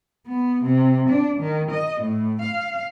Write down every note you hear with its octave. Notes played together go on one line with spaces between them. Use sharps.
B3
C3
D4
D#3
D#5
A2
F5